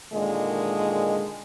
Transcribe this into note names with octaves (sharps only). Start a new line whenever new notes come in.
A#2 D3 D#3 G#3